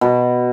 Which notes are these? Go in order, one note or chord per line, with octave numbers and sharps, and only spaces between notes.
B2